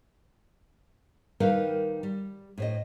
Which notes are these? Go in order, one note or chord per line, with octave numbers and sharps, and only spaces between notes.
D#3 G3 D#4 A#4 B4 F5
G3
A2 C5 D#5